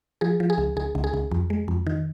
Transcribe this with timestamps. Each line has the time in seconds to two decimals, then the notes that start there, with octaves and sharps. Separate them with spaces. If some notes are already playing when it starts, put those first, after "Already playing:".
0.21 F3 G#4
0.40 F3
0.50 G#4
0.58 C#2
0.77 C#2 G#4
0.95 C#2
1.04 G#4
1.14 C#2
1.31 F2
1.50 G#3
1.68 F2
1.87 D#3